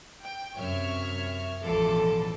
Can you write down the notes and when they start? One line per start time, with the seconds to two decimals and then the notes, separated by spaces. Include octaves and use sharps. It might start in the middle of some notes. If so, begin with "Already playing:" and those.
0.23 G5
0.56 F#2 C3 C#5 E5 F6
1.63 A1 E2 B2 F3 A4 D6